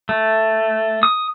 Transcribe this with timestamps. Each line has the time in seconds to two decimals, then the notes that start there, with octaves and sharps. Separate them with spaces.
0.09 A3
1.03 D#6